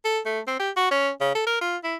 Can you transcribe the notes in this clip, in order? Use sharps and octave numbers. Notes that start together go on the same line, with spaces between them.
A4
A3
C4
G4
F#4
C#4
C#3
A4
A#4
F4
E4